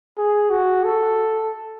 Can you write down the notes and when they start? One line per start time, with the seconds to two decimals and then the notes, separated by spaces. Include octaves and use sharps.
0.18 G#4
0.50 F#4
0.84 A4